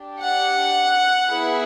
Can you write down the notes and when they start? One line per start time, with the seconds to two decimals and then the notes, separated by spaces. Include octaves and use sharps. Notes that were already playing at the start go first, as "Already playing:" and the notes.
Already playing: D4 G4
0.22 F#5
1.29 B3 E4 G#4